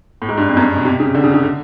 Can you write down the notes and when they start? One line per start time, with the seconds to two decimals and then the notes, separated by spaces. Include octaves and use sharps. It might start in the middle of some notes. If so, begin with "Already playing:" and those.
0.22 A2
0.29 G#2
0.37 G2
0.48 F2
0.57 F#2
0.76 B2
0.85 C3
1.00 C#3
1.15 D3
1.24 C#3
1.34 C#3
1.43 D3